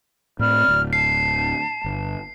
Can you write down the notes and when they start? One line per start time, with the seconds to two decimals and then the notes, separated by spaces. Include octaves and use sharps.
0.39 A2 A3 C4 D5 B5 F6
0.68 D1 D2
0.93 A5 C7
1.84 G1